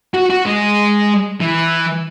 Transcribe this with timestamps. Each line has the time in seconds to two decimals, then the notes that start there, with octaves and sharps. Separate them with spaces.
0.14 F#4
0.30 F#4
0.46 G#3
1.41 E3